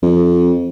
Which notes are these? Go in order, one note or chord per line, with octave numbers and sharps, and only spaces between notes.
F2